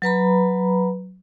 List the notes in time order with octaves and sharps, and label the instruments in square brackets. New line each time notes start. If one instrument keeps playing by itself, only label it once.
[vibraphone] F#3 B4 A#5 B5